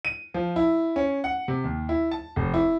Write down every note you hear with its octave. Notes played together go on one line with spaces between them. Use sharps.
D#7
F3
E4
C#4
F#5
C3
D#2
E4
A5
F1
E4